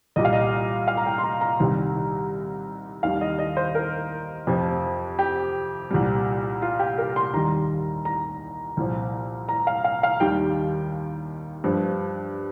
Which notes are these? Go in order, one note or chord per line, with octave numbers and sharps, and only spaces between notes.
C2 A#2 G3 D#5
F5
D#5
F5
A#5
G5
C6
A#5
A#5
C2 C3 D#3 G3
D#2 D#3 G3 F5
D#5
D#5
C5
A#4
F2 C3 F3
G4
C2 A#2 G3
F4
G4
A#4
C6
D#2 D#3 G3 A#5
A#5
C2 A#2 F3
A#5
F5
F5
F5
D#2 D#3 G3 G5
G2 F3